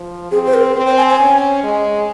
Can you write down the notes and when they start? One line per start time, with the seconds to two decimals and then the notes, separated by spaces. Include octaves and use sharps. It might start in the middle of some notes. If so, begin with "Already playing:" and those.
Already playing: F3
0.31 C4 G#4
0.46 C5
0.54 A#4
0.76 C4
0.87 C5
0.98 G#5
1.09 G#5
1.20 C#4
1.63 G#3